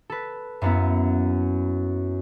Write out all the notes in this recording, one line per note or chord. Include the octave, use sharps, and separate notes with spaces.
A4 B4
F#2 A#3 B3 C#4 E4